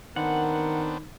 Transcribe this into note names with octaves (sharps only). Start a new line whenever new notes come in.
D#3 B3 C4 D4 A#4 F#5